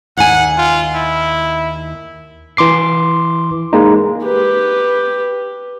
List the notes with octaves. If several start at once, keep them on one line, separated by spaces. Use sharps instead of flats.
D#2 F#5 G#5
F4
E4
E3 C6 D6 C7
G#3 A#3 D#4
G4 B4